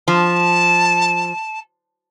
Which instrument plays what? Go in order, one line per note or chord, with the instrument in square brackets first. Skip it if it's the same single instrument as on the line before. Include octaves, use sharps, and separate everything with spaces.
[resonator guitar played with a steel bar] F3 [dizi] A5